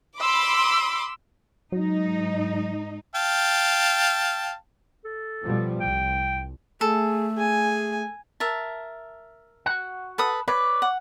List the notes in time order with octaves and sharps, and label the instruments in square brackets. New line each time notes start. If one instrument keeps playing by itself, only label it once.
[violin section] B5 C6 D6 [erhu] E6
[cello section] G#2 D#4 [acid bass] F#3
[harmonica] F5 G5 A5
[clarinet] A4
[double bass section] B2 F3 G3
[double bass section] C2 [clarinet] G5
[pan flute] A3 [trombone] G#4 [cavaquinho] A4
[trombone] G#4 [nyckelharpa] G#5
[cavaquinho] A#4 E5 A5
[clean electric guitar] F#4 F#5
[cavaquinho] A4 B4 D#6
[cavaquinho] B4 [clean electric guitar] C#5 D5
[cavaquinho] F#5